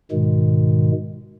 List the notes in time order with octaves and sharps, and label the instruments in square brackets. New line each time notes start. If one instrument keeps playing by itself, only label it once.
[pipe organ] G#2 B2 D#3 G#3